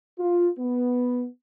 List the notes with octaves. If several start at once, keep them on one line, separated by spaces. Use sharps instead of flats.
F4
B3